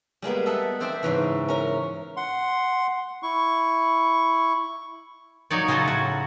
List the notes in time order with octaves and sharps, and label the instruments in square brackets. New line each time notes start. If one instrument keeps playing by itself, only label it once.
[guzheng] G3 G#3 A#3 B3
A4 D#5 E5 F#5
C4 C5 D5 E5 G5
G#2 C#3 E3
C#4 A#4
[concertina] F#5 C6
E4 C#6
[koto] F#3 A#3 D#4 C#5 D5
C#3 F#3 C#4 F4 F#4 A4
A2 F#4